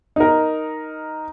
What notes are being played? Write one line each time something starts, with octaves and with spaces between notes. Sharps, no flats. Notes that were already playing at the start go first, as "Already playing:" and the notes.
D#4 A#4